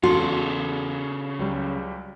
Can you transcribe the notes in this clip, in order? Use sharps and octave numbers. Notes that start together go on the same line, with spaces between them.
E2 C#3 F4 F#4 A4
C#2 F#3 G3